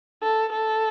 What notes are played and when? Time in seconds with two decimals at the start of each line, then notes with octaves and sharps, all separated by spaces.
0.23 A4
0.53 A4